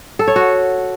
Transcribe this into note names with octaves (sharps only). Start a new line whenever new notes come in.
A4
C#5
F#4